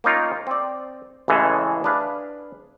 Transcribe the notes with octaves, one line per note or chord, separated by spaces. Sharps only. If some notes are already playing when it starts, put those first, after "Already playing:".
A#3 C#4 D#4 F4 A#4
C4 D5
A1 C#3 E3 G#3 G#4 A4
D4 G#4 B4 F5